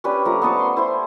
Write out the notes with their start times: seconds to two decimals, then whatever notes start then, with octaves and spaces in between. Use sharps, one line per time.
0.04 C#4 D4 G4 B4
0.25 F3 A3 A#5
0.42 B3 D#5 A5 C#6
0.59 C6
0.77 E4 C5 C6